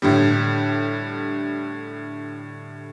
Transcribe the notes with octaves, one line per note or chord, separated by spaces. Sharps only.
A2 D3 G3